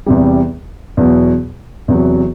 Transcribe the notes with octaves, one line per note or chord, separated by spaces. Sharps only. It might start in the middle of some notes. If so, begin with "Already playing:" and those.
E2 C3 G3
E2 B2 F#3
E2 C3 F#3